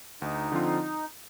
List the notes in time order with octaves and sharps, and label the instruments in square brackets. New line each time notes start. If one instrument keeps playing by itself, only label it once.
[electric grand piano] D2 [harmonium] D#4
[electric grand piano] D3 F3 C4 F4